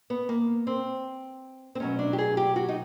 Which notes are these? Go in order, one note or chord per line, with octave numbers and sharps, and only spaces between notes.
B3
A#3
C4
C4
B2 F#3 A3 C#4
D4
G4
G#4
G4
F#4
D#4